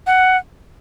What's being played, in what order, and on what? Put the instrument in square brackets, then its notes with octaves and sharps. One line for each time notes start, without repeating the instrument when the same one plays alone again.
[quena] F#5